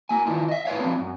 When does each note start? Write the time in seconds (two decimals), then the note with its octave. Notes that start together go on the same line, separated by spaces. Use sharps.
0.09 A#3 G#5
0.25 D#3 E3 D4 F4
0.48 D#5 E5
0.66 A2 B4 C#5 F5
0.80 D3 F3 F#3 G#3 C4 D4
0.99 F#2